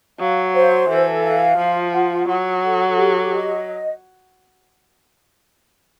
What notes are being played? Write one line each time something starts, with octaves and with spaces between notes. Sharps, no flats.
F#3 F5
C5
E3 A4
F5
F3 F4
F#5
F#3 F#5
A4
G4
D#5